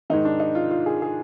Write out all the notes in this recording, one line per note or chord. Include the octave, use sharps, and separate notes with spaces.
G#2 D#3 D#4
D4
D#4
F4
F4
G#4
G#4